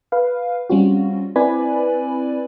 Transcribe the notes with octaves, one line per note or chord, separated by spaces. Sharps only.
B4 F5
G3 C4 C#4 F4 F#4
C4 E4 B4 D5 G#5 B5